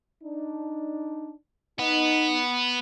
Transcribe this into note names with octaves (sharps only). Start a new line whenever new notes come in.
D4 D#4
B3 D#4